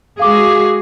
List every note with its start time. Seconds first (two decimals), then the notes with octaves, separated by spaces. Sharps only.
0.19 G#3 F#4 G#4 F5 D6